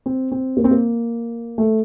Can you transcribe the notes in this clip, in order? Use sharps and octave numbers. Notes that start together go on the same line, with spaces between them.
C4
C4
A#3
C4
A#3
A3